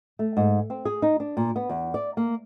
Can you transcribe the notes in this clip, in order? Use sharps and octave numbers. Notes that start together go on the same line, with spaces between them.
A3
G#2
C4
G#4
D#4
D4
A#2
B3
E2
D5
A#3